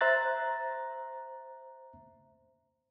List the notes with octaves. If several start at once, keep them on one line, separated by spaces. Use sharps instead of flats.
C5 E5 A#5 F#6 A6